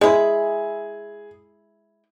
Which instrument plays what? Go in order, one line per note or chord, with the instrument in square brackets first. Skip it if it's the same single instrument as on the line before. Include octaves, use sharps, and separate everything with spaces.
[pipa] G#3 E4 [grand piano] G#4